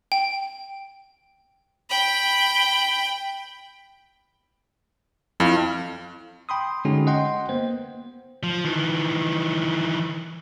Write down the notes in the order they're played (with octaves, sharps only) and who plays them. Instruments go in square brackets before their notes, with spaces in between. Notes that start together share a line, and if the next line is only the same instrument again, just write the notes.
[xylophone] G5
[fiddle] G5 B5
[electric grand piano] F2 [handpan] E4 F5
[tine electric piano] G5 B5 C6 D#6
D3 G#3 C#4 D#4 F#4
D#5 F#5 G5 C6
A#3 B3 C5
[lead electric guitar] F3
D#3 E3